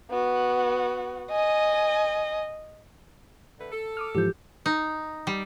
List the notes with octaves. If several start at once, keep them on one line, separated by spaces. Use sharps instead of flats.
B3 F#4
D#5 G#5
D3 A3 B4
A4
D6 D#6 F6
G#2 E3 F3 G4 G6
D#4
G3